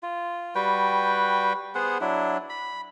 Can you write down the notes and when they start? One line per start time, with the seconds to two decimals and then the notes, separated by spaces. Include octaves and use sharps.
0.03 F4
0.55 G3 F#4 B4 G5
1.75 B3 G#4 C5 F#5
2.01 F#3 D4 E4
2.50 B5